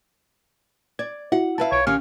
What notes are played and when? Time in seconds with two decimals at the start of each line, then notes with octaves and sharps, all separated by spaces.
0.99 D5 G#6
1.32 E4 F#4 F#5
1.58 E4 B4 E5 F5 A5
1.72 B1 C#5 G#6 D7
1.87 D#3 C#4 G4 F5